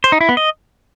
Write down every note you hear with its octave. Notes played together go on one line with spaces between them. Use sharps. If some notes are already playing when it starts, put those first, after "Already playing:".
C5
D#4
E4
B3
D#5